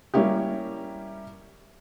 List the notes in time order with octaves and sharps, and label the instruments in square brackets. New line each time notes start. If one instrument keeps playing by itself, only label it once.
[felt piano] G3 A#3 C#4 E4 G4